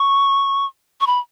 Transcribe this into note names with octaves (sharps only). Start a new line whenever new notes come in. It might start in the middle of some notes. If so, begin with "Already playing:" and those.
Already playing: C#6
C#6
B5